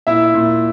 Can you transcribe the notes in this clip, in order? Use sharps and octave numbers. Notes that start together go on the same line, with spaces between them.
A#2 E4 E5
A#2